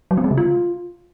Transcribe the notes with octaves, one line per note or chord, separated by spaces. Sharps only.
F#3
C4
G#3
C#3
F4